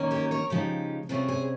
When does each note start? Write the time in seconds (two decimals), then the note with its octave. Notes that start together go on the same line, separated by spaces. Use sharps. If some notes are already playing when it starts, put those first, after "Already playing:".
Already playing: D#3 A#3 C#4
0.11 G4 A#4
0.31 A#4 C#5
0.50 C#3 F3 G#3 D#4 G4
1.09 C3 G3 C#4 F4 G#4
1.28 G#4 C5